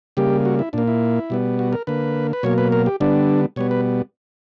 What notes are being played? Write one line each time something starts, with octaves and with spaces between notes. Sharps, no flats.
C#3 G3 A#3 G4
F#4
E4
A#2 A#3 D4
E4
B2 G3 B3
F#4
A#4
D3 A#3 B4
B4
B2 F#3 A#3 C#5
B4
A#4
G4
D3 G3 B3 D4
B2 G3 B3 C#5
B4